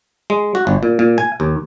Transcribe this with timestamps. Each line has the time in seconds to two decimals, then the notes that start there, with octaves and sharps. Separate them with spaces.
0.30 G#3
0.55 F#4
0.67 G1
0.83 A#2
0.99 A#2
1.18 G#5
1.40 D#2